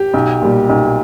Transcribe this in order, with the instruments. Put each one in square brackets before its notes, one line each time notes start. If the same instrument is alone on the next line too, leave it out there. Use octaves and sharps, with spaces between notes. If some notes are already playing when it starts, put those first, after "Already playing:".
Already playing: [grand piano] G4
[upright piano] B1
A#2 G3
B1